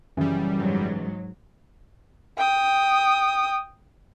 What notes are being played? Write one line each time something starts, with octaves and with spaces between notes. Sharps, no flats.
F#2 C#3 E3 G3 G#4
G#2 F#3
G5 D#6